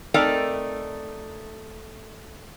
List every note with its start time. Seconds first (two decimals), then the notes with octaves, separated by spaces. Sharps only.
0.14 A3 C4 D#4 A#4 D5